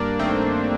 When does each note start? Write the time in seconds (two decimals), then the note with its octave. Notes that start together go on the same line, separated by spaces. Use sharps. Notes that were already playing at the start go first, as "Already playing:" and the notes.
Already playing: G2 A#3 D4
0.19 D#3 A3 C4